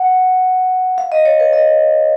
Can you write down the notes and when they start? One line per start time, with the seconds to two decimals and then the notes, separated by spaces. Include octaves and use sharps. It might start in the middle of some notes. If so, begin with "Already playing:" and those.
Already playing: F#5
0.98 F5
1.12 D#5
1.25 C#5
1.40 B4
1.53 D#5